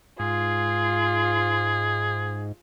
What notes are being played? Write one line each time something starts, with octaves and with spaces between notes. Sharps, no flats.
G#2 F4 G#4